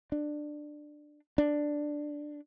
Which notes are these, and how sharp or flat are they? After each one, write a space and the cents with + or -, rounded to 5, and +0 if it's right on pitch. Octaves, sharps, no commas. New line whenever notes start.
D4 +15
D4 +5